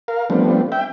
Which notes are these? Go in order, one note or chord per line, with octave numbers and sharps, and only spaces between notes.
A#4 F5
F3 G3 A3 B3 C4 D4
E5 G5